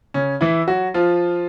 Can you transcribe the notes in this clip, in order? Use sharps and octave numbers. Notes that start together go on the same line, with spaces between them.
C#3 C#4
E3 E4
F#3 F#4
F3 F4